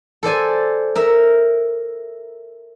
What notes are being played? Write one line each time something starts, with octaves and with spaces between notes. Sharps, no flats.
A4 C5 D5 G#5
A#4 E5